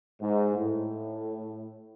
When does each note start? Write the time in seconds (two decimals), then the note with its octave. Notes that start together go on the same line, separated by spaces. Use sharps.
0.21 G#2
0.55 A2